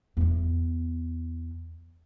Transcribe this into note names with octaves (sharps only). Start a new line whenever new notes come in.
E2 B3